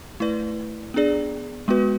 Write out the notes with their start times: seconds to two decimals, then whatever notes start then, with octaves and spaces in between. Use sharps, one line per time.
0.20 A3 E4 B4 D5
0.94 B3 D4 G#4 D5
1.68 G#3 B3 F#4 B4